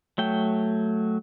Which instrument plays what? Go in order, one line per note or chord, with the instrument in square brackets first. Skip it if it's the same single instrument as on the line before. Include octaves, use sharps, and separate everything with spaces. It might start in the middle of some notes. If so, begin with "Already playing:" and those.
[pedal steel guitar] F#3 A3 G5